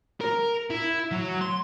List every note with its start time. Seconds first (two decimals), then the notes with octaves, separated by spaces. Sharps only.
0.21 A#4
0.70 E4
1.11 F#3
1.41 C6